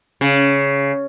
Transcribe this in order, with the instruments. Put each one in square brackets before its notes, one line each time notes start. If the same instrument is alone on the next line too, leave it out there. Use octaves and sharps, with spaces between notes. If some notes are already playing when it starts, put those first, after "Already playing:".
[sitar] C#3